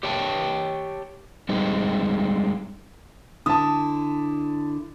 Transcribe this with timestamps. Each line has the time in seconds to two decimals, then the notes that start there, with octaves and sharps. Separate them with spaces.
0.03 G4 C#5 G5 A5
1.49 G3 G#3 C4 D#4
3.46 D3 E4 A5 D#6